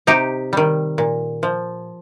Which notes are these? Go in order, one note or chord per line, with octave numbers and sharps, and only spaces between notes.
C3 D#4 G4
D#3 G3
A#2
F3